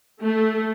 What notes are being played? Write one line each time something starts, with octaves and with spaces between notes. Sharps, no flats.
A3